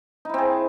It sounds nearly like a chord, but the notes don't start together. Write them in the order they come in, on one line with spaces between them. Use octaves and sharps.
D#4 E4 C4 G#4